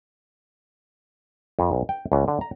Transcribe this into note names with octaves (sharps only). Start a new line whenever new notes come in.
F2
B1
G5
C#2
D3
A#5